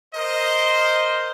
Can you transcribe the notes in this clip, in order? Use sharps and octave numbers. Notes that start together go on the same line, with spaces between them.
A#4 C5 D#5